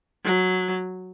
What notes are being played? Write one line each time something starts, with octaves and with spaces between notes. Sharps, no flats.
F#3